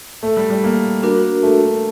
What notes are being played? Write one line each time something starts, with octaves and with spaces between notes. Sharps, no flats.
A3
G3
G3
A#3
D4 F#4 A#4
A3